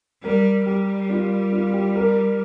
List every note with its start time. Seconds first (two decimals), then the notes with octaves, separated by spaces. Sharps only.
0.23 G3 A#4
0.66 G3 G4
1.10 F4
1.53 F4
1.73 G4
1.96 A#4